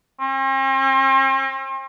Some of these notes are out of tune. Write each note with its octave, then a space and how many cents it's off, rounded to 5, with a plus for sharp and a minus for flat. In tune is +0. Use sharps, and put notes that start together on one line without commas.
C4 +45